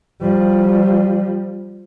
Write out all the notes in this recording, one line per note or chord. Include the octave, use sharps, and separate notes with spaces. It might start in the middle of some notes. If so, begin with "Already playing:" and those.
F3 G3